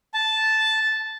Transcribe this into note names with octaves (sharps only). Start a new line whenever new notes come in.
A5